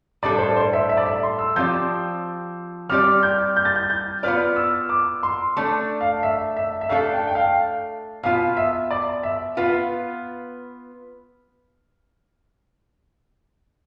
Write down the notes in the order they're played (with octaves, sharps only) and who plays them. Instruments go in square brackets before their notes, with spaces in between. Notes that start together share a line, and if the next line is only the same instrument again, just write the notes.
[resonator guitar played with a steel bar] A2 G3 D4 A4 [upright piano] D5
[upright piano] C5
C5
E5
E5
D5
E5
C6
E6
[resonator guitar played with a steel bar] F3 C4 G4 D5 [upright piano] G6
[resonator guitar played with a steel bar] G3 C4 G4 D5 [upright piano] F6
[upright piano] G6
G6
A6
G6
G6
[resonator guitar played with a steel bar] B3 F4 B4 D5 [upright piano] F6
[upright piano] E6
D6
C6
[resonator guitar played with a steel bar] A3 D4 A4
[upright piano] F5
E5
E5
E5
[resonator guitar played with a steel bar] A3 D4 A4 [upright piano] F5
[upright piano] G5
G5
F5
[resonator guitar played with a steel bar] B2 B3 F4 [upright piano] F5
[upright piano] E5
D5
E5
[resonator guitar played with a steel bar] B3 F4 B4 [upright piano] F5